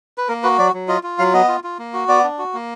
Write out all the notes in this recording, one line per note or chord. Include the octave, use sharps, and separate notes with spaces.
B4
A#3 A#4
F#4 B4
F#3 D5
F#3
F4 D#5
F4
F#3 F5
B3 D#5
F4
F4
A#3
F#4
B3 D5
D4
F#4
A#3